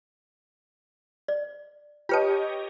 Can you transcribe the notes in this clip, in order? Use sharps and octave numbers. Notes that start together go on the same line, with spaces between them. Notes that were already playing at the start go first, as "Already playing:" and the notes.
D5
F4 G4 B4 C#5 D#5 A5